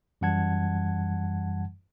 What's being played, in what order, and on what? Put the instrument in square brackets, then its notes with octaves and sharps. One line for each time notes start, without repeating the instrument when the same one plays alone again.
[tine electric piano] F#2 E3 G3 F#5 A5 G#6